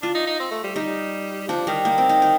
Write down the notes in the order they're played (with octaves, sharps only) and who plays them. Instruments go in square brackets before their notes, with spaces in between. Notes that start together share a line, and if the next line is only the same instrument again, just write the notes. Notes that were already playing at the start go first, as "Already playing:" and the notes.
[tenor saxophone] D4 [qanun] F4
[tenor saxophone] D#4
D#4
C4
A3
G3
[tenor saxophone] G3 [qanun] D#4
[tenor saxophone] F3 [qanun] D4
[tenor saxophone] D#3 [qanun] G3
[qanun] A#3
C4
D#4
D#4